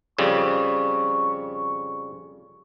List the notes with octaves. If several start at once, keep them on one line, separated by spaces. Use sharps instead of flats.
F2 C#3 G3 C#6